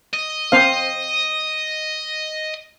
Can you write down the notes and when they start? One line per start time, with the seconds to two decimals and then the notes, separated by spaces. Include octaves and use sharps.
0.13 D#5
0.52 C4 C5 F5